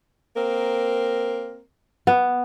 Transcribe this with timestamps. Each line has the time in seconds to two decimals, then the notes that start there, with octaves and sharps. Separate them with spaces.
0.36 A#3 C4 A#4
2.07 B3